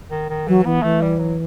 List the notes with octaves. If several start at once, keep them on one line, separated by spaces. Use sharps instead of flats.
D#3
D#3
E3 F#3
E3 B3
E3 A3
G3
F#3